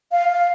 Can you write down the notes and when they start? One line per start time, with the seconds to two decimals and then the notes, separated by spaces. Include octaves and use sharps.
0.12 F5
0.29 F5